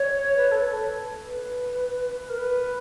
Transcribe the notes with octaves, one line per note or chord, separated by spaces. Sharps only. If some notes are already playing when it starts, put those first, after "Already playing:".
Already playing: C#5
B4
A4
B4
B4
A#4
B4